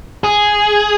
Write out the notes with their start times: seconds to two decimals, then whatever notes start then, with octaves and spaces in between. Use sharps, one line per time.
0.24 G#4